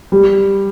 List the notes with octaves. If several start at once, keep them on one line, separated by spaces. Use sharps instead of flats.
G3